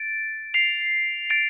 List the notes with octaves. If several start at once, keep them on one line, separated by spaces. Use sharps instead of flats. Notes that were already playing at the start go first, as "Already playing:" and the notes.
Already playing: A6 D7
C7 F7
A6 D7